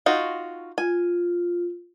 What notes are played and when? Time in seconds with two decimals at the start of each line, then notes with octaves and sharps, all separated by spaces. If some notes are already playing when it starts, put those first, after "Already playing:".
0.06 D#4 F4 F#4
0.78 F4 G#5